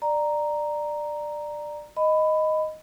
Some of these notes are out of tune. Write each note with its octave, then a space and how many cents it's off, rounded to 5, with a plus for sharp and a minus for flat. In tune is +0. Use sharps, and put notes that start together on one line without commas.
D5 +15 A#5 +0
D#5 +0 B5 +15